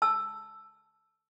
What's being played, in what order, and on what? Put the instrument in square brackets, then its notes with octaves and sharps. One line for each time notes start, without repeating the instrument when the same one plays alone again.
[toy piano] A5 E6